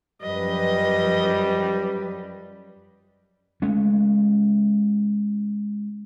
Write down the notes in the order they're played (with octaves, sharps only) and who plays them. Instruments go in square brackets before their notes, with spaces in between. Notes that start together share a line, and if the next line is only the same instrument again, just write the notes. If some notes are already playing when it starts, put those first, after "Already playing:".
[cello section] F#2 F3 B4 [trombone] G3 [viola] D#5
[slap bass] G#3 A3 C#4